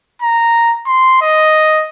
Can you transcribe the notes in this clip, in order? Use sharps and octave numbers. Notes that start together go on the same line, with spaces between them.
A#5
C6
D#5